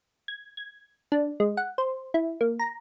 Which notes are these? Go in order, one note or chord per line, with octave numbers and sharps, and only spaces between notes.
G#6
G#6
D4
G#3
F#5
C5
E4
A#3
A#5